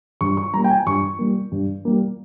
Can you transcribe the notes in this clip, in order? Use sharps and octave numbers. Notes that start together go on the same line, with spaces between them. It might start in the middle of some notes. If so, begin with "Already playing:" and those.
G2 C#6
C#6
G3 A#3 A#5
G5
G#5
G2 C#6
G3 A#3
G2
G3 A#3